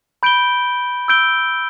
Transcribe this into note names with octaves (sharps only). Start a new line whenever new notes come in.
B5 G6 D7 G7
E6 G6 D7 G7